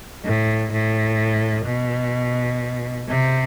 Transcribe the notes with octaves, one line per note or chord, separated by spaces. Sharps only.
A2
A2
B2
C3